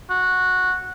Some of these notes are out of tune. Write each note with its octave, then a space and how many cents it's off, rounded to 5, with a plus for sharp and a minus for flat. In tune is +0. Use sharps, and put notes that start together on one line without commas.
F#4 -10